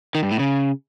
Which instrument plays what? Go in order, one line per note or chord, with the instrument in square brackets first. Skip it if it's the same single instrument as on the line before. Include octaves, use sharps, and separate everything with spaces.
[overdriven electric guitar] D#3
G2
A2
C#3